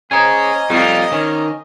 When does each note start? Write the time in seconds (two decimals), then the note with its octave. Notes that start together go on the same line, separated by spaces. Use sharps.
0.11 A#3 C#4 G#4 C5 C#5 D#5 A#5 G#6
0.70 F2 G3 F4
1.12 D#3 C#4